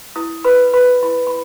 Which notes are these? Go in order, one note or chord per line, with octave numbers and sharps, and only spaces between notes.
E4 D#6
B4 B5
B4 B5
E4 B5
B5